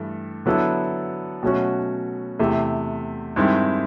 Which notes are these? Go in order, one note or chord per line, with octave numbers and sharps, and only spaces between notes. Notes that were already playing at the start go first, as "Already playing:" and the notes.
Already playing: G2 E3 A3
D3 F#3 B3 E4 A4
B2 F#3 A3 C#4 F#4
E2 C3 E3 A3
G2 D#3 G#3 C4 E4